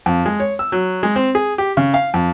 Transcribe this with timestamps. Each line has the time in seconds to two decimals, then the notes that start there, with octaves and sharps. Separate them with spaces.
0.06 F2
0.26 G#3
0.40 C#5
0.59 E6
0.72 F#3
1.03 G#3
1.16 C4
1.35 G#4
1.58 G4
1.77 C#3
1.94 F5
2.14 F2